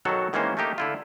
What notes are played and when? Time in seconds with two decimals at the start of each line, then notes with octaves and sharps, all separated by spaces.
0.05 B2 D#3 F#3 F#4 A4
0.33 D#3 E3 G#3 A#3 C#4 C5
0.57 A3 A#3 D#4 G4
0.78 D3 E4 F4